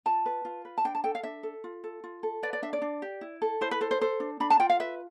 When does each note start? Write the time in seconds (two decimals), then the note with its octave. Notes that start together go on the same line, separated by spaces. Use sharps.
0.06 F4 A5
0.26 B4
0.45 F4
0.65 B4
0.78 A5
0.85 D4 G5
0.95 A5
1.04 A4 G5
1.15 F5
1.23 D4 E5
1.43 A4
1.64 F4
1.84 A4
2.04 F4
2.23 A4
2.43 B4 D5
2.53 D5
2.62 D4 E5
2.73 D5
2.82 D4
3.02 G4
3.21 E4
3.42 A4
3.61 E4 C5
3.71 B4
3.81 A4 C5
3.91 C5
4.01 A4 C5
4.20 D4
4.40 D4 B5
4.50 A5
4.60 F4 G5
4.69 F5
4.80 B4 E5